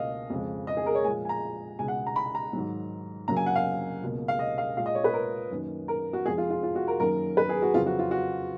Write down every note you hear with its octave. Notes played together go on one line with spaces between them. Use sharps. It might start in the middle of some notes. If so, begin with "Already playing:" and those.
Already playing: C#2 B2 A#3 D#5 F5
F2 C#3 G#3
D#5
G#4
A#4
C#5
A#2 F3 G#3 G#5
G#5
A#5
C#2 B2 G#3 G#5
F#5
A#5
B5
A#5
G#2 D#3 F#3
F#2 C#3 F#3 A#3 A#5
G#5
F#5
F5
C#2 B2 A#3
F5
D#5
F5
A#2 G#3 F5
D#5
C#5
B4
A#4
F#2 D#3 A#3
A#4
F#4
F2 F3 G#3 G#4
F4
F4
F4
F#4
A#4
F#2 D#3 F#3 A#3 A#4
B4
G#4
F#4
F2 C#3 F#3 F4
F#4
F4
F#4